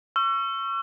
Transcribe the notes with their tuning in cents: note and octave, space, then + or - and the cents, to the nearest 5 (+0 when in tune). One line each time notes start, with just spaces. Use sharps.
C#6 +0 E6 +40